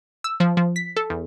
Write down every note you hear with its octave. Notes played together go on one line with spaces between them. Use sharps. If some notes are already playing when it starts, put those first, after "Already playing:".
E6
F3
F3
B6
A4
E2